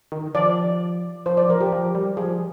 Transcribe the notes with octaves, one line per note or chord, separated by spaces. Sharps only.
D#3
F3 D5
F3 C5
D5
F3 A#4
G4
F3
G3
F3 G#4